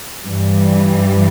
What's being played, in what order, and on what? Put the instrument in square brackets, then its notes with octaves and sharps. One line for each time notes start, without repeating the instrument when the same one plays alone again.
[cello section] G2 E3 G3